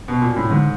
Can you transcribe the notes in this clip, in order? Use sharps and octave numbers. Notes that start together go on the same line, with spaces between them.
B2
A#2
A2
G#2 D3